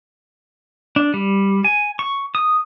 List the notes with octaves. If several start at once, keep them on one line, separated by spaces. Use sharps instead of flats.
D4
G3
G#5
C#6
D#6